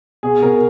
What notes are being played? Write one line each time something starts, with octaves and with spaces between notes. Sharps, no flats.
B2 G#4
B2 A#4